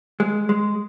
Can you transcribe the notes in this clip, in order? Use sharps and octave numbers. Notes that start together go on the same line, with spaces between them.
G#3
G#3